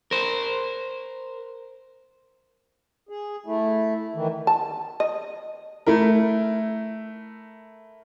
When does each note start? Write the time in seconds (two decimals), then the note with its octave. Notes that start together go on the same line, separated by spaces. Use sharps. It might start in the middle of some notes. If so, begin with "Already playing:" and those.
0.11 A#4 C5
3.09 G#4
3.46 A3 E4
4.15 D#3 E3
4.47 A5
5.00 D#5
5.87 A3 E4 A#4